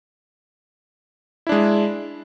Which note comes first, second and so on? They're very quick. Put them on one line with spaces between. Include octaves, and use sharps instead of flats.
E4 D4 G#3